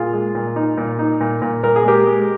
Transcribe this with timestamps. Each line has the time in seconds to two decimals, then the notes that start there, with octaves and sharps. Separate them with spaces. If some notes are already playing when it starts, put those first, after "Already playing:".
Already playing: A#2 F4 G#4
0.13 G#3
0.35 A#2
0.56 D#4
0.78 A#2
0.99 D#4
1.21 A#2
1.42 A#2
1.63 A#2 A#4
1.76 G#4
1.85 G#3 G4 A#4
2.06 G#3